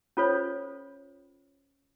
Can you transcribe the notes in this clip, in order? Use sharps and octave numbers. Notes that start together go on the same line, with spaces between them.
C#4 F4 A4 C5 C#5